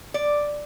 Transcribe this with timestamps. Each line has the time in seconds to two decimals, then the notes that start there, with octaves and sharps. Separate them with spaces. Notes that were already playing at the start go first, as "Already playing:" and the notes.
0.14 D5